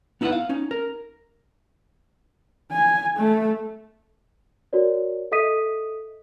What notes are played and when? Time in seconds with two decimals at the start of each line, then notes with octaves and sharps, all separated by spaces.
0.21 B3 D#4 E4 A4 B4 F#5
0.32 F5
0.49 C#4 D#4
0.71 A#4
2.72 G#5
3.17 A3
4.73 F#4 A#4 C#5 D5
5.32 A4 D#5 E5 D#6 B6 D#7